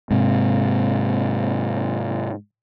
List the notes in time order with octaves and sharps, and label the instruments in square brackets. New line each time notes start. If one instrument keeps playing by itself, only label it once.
[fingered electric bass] G#2 C3